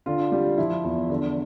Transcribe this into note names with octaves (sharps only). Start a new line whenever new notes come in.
D3 F4
G3
F3 E4
E2
D3